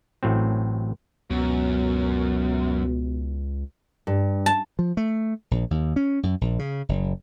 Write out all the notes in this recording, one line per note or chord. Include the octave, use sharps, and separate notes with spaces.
A1 A2 F#3 C4
C#2 F#2 B2
G2
A5
F3
A3
A#1
D#2
C#4
F#2
A#1
C#3
F#1